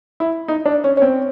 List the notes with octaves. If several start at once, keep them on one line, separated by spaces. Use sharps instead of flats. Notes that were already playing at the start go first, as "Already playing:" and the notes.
E4
D#4
D4
C#4
C#4
C4